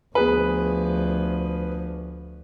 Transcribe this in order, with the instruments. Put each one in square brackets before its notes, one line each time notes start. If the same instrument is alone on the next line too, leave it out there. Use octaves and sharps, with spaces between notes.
[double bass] D2 F3 [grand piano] B3 G#4 B4